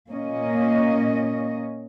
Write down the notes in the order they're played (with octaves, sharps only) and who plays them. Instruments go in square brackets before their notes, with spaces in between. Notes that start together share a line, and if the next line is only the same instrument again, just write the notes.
[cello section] A#2 A#3 C#4 D#5